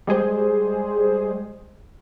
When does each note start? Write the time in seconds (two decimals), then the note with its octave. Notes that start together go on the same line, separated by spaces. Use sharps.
0.07 G3 G#3 G#4 C5